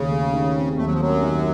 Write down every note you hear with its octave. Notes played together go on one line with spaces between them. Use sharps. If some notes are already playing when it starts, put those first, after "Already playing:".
Already playing: D#2 C#3
A3
D#3
C4
D#2 A3
F#3
F3
F#2 F#3 A3
D#3